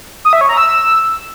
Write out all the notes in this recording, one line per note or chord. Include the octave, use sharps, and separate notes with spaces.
D#6
E5
C#5
A#5
E6